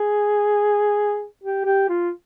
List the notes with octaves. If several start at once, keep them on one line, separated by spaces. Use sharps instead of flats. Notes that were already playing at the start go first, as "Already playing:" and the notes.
Already playing: G#4
G4
G4
F4